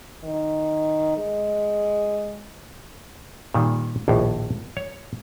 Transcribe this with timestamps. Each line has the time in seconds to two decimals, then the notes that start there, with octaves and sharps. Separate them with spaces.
0.24 D#3
1.17 G#3
3.54 A#2 D#3 G3
4.08 A#1 D#2 A2
4.77 C#5